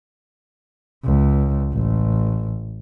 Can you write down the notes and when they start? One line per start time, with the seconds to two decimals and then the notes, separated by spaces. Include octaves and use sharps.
1.05 C#2
1.73 A1